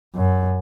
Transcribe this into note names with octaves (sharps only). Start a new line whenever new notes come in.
F#2